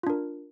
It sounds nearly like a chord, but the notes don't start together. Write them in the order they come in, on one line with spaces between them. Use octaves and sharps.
F4 D4 A#4